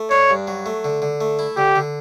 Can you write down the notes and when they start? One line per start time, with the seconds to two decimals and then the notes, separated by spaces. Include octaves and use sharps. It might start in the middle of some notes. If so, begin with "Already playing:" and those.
Already playing: A3
0.11 D4 C#5
0.30 G2
0.48 F#3
0.66 A3
0.84 D3
1.02 D3
1.21 A3
1.39 E4
1.57 D3 G4
1.76 D3